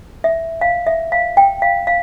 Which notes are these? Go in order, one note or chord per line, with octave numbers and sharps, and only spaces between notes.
E5
F5
E5
F5
G5
F5
F5